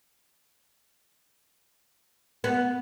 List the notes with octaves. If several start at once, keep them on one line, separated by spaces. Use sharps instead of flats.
B3